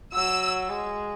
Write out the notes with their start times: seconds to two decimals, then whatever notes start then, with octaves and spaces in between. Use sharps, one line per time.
0.14 F#3 E6
0.69 G#3